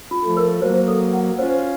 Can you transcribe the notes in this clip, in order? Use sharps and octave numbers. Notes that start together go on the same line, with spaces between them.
F4
F3 A3
A#4
F#3 A#3 C5
A4
F#5
C#4 F4 C5